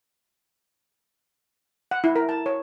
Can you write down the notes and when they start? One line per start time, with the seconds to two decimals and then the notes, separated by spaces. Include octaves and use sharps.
1.91 F#5
2.04 E4
2.16 A#4
2.29 A5
2.46 C#5